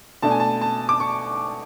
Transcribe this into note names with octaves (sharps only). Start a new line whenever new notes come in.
B2 A3 D4 A5
G#5
A5
A5
D6
C#6